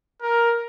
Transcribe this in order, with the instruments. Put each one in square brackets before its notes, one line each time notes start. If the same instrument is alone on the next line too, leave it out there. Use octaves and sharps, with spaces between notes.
[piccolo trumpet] A#4